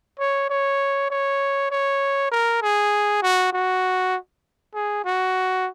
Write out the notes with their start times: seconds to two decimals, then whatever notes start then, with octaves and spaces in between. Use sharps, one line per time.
0.19 C#5
0.50 C#5
1.11 C#5
1.71 C#5
2.32 A#4
2.62 G#4
3.22 F#4
3.53 F#4
4.74 G#4
5.05 F#4